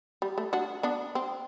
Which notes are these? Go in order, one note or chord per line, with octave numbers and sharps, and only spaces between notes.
G3
A3
D4 F#4
B3 D4
C4